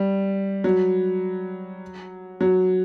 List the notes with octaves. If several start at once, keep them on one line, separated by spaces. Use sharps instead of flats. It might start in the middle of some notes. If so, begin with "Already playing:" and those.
Already playing: G3
F#3
F#3